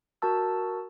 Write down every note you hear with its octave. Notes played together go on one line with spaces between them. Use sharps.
F#4 A#4 A5 E6